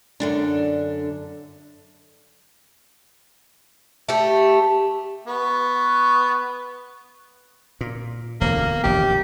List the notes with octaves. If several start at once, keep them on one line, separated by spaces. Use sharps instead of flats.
F#2 D3 D4
A3 G4
B3 C#6
A#2
E1 D2 D3 A#3
E1 A#1 D#3 G4